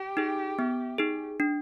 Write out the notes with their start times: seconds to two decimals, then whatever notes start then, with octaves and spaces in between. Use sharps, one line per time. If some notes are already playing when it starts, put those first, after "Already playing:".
Already playing: G4
0.17 D#4 G#4
0.59 B3
0.98 D#4 G#4
1.40 D4